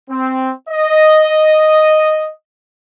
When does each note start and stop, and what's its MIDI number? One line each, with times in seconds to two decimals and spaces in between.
0.10 0.51 60
0.69 2.31 75